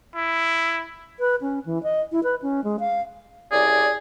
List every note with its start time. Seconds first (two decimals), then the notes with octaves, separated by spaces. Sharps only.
0.15 E4
1.20 B4
1.41 C#4
1.66 E3
1.83 D#5
2.12 E4
2.23 B4
2.42 C#4
2.64 G#3
2.80 F5
3.52 C2 C#3 G#4 D5